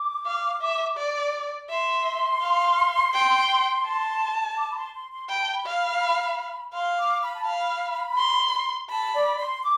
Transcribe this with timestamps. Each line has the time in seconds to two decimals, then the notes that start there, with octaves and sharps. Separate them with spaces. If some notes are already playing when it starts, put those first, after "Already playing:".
Already playing: D6
0.26 F5
0.62 E5
0.97 D5
1.69 E5 C6
2.41 F5
3.14 G5
3.85 A5
4.58 D6
4.71 B5
4.76 C6
4.94 C6
5.11 C6
5.29 G5 B5
5.41 A5
5.53 B5
5.66 F5
6.74 F5 C6
6.98 D6
7.22 B5
7.34 A5
7.45 F5 B5
8.18 C6
8.90 A5 B5
9.14 D5
9.38 C6
9.62 D6